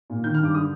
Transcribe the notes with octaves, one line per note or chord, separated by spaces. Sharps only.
A#2
D#3 G6
F6
G2
D6
D3 D#6